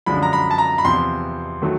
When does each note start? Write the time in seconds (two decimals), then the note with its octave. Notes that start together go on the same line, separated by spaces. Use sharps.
0.06 F#2 D3 F3 G#3 B5
0.23 A#5
0.33 B5
0.51 A5
0.58 A#5
0.78 B5
0.85 E2 C3 F3 C6
1.62 D#3 F#3 A3